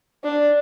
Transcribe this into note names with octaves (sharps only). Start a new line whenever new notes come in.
D4